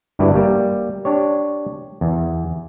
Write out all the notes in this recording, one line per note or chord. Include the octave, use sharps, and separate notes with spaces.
G1 G2 E4 F#4 B4 D5
G3 A#3
D4 G4 C#5
E2